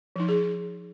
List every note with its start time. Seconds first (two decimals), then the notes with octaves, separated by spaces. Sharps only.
0.16 F3 D#4
0.29 G#4